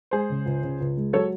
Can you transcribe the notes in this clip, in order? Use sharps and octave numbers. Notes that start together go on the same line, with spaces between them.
G#3 G#4 C5
C#3
C#2
C#3
C#2
G#3
F#3 A4 C#5